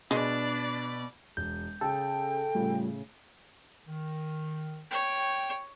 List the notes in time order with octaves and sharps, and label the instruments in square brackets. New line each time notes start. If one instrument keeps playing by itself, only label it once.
[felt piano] B2 [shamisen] G#3 [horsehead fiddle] D4 [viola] D5 B5
[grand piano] E1 [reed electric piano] G6
[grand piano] C#3 G#4 [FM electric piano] A4 [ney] G5
[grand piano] A2 C#3 [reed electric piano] G3 A3 F4
[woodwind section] D#3
[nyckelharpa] C#5 [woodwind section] G5